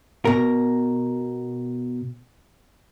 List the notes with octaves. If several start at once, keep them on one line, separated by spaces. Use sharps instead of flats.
B2 A#4